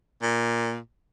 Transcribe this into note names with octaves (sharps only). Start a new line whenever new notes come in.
A#2